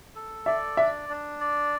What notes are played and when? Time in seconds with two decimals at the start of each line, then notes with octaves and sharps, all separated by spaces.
0.15 A4
0.46 D5 E5
0.77 D4 E5
1.09 D4
1.40 D5